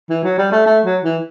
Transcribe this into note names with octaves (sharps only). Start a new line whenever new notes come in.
E3
F#3
G3
A3
A3
F#3
E3